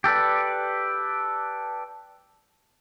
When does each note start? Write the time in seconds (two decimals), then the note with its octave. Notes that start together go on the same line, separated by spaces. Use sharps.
0.04 G4 A4 B4 D5